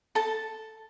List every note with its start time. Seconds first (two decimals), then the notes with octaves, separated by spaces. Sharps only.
0.15 A4 A5